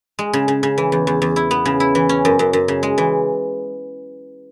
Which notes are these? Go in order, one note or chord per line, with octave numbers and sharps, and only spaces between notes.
G#3
C#3
C#3
C#3
E3
E2
E2
E2
E4
B3
C#3
E4
E3
C#4
F#2
F#2
F#2
C#3
G#3
E3